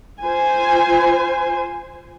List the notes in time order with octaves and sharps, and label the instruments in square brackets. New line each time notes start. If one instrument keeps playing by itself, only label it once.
[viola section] F4 C5 G#5